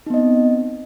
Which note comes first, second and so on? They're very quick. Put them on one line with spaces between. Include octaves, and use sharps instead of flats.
D#4 B3 D#5 C4